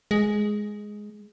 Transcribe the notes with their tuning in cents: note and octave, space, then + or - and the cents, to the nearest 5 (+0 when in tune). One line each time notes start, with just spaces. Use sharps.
G#3 +5